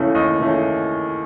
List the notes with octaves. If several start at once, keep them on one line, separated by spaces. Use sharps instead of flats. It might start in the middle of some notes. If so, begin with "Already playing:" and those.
Already playing: D#2 C#3 E3 A3 C#4
D#2 D#5
C#3 E3 A3 C#4